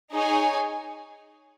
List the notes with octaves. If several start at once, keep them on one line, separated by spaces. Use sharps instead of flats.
D#4 G#4 C#5 G#5